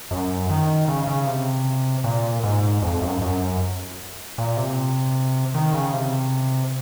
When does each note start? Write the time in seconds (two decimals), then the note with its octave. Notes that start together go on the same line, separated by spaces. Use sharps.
0.11 F#2
0.50 D#3
0.88 C#3
1.07 C#3
1.27 C3
2.04 A#2
2.44 G#2
2.82 F2
3.02 F#2
3.21 F#2
4.38 A#2
4.57 C3
5.54 D#3
5.74 C#3
5.93 C3